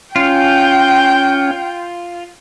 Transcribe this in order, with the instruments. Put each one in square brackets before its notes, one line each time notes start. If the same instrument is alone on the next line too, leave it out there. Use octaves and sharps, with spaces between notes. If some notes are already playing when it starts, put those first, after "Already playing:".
[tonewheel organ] C#4 [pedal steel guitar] F4 [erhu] G5